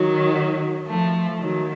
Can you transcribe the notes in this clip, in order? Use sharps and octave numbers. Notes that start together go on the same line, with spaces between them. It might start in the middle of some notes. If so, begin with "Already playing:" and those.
Already playing: D#3 F#3
F3 A3
D#3 F#3